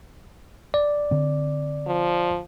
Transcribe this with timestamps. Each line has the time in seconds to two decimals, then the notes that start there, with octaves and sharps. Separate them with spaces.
0.74 D5
1.11 D3 C4
1.86 F3